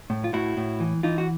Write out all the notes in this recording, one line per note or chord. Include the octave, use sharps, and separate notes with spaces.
A2
F4
A2 E4 F#4
A2
E3
E3 D#4 F4
F#4